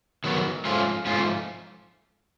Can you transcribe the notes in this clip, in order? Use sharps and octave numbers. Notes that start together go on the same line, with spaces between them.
D#3 F#3 B3
G#2 F3 A3 C#4 F4
G#2 F3 A3 C#4 F4